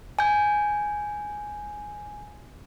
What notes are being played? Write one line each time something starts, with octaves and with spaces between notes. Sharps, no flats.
G#5 G6